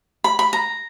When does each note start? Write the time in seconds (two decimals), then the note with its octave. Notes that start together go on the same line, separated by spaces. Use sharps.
0.24 B5
0.39 B5
0.53 A#5